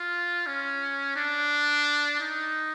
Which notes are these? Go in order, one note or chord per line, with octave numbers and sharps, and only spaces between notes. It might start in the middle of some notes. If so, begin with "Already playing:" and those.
Already playing: F4
C#4
D4
D#4